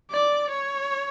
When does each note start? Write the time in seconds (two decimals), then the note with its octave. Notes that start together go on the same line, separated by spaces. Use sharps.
0.11 D5
0.50 C#5